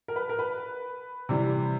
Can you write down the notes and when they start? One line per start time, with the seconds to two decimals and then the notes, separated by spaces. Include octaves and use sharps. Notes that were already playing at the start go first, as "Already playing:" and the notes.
0.08 A#4
0.16 B4
0.29 A#4
0.39 B4
1.29 C3 E3 G3